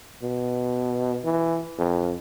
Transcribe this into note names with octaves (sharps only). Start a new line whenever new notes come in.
B2
E3
F2